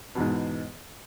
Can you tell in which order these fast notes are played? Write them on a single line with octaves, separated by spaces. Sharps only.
B2 E2 G#2